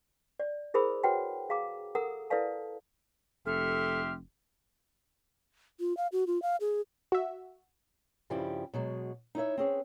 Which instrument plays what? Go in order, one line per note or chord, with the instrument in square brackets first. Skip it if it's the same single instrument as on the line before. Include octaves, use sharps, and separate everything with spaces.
[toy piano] D5
E4 G#4 A#4 C5 B5 D#6
F#4 B4 C#5 F#5 G5 A5
G#4 F5 A#5 D6
A4 A#4 F#5 A#5 D#6
E4 A4 B4 D5 F5 A5
[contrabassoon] F1 [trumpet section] G4 E5 C6 [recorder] A4 [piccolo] F6
[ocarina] F4
F5
F#4
F4
F5
G#4
[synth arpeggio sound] F#4 E5
[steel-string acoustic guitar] G2 C#3 F3 G3 E4 G4
B2 F#3 G#3
D#4 E4 C5 C#5 E5
C4 C#4 G#4 B4